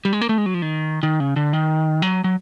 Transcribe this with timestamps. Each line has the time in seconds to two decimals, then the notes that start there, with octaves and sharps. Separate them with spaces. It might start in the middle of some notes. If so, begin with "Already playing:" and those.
0.05 G3
0.13 G#3
0.21 A#3
0.29 A3
0.38 G#3
0.46 F#3
0.54 F3
0.62 D#3
1.03 D#3
1.20 C#3
1.36 D3
1.53 D#3
2.02 F#3
2.24 F#3